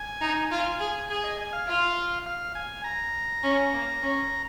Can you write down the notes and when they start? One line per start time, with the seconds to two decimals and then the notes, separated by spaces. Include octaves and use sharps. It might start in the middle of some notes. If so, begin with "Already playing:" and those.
Already playing: G#5
0.21 D#4
0.50 F4 G#5
0.79 G#4
1.08 G#4 G#5
1.24 D#5
1.38 G#5
1.53 F5
1.67 F4
2.26 F5
2.55 G#5
2.84 A#5
3.43 C#4
3.73 A#3
4.02 C#4